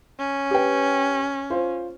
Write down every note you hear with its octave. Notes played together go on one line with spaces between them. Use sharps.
C#4
G4 B4 G5
F4 C5